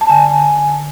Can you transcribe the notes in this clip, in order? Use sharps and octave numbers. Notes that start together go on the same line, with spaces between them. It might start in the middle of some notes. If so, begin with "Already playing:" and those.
A5
D3 G#5
D3